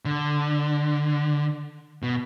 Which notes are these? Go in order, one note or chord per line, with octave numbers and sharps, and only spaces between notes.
D3
B2